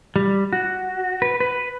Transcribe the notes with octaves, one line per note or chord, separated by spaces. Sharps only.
G3
F#4
B4
B4